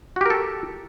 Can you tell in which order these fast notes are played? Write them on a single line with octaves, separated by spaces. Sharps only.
F#4 G4 A#4 A4